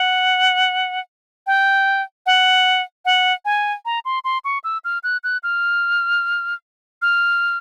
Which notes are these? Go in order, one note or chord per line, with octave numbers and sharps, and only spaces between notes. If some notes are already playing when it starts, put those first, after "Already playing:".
Already playing: F#5
G5
F#5
F#5
G#5
A#5
C6
C6
C#6
E6
F6
F#6
F#6
F6
F6